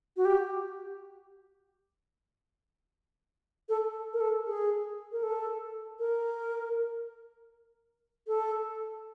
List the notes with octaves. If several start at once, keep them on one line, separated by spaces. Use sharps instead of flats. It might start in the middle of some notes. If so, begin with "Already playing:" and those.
F#4
G4
A4
A#4
A4
G#4
A#4
A4
A#4
A4